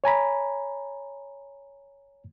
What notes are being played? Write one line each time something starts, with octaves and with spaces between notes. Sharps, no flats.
C#5 G#5 A#5 B5